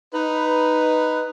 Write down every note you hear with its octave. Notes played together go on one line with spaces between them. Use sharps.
D#4 B4